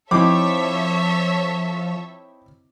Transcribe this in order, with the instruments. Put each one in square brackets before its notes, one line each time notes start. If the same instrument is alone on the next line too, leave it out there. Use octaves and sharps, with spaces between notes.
[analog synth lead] F3 [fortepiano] C4 D#4 E4 [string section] A4 C#5 E5 [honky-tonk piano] D6